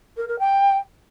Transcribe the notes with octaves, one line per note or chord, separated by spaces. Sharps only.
A#4
A#4
G5